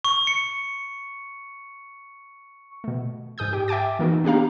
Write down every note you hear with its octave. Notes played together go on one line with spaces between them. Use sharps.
C#6
C#7
B2 A3
G#2 G#4 D#6 G6
G4
E5 G5 G#5 D6 A6
E3 A#3 D#4 F#4
B3 D4 G4 F5 A#5